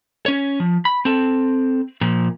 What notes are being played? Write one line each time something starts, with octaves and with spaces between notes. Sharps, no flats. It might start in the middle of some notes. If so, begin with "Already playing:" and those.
C#4 C#5
F3
B5
C4 A4
A#2 F3